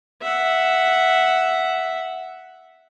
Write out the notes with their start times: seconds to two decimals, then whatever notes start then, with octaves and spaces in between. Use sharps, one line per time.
0.22 E5 F#5